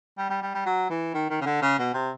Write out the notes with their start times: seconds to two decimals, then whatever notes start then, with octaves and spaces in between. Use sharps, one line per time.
0.18 G3
0.30 G3
0.42 G3
0.54 G3
0.66 F#3
0.90 E3
1.14 D#3
1.30 D#3
1.41 C#3
1.46 D3
1.62 C#3
1.78 B2
1.94 C3